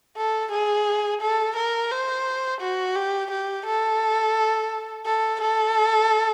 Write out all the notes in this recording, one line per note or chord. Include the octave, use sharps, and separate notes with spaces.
A4
G#4
A4
A#4
C5
F#4
G4
G4
A4
A4
A4